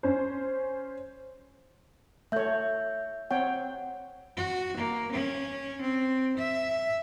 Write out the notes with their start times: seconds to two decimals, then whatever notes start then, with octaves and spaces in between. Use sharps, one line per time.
0.03 C#4 C5
2.32 A3 C#5 E5 G6
3.31 C4 C#5 F#5 G5
4.37 F#4
4.77 A#3
5.11 C#4
5.82 C4
6.37 E5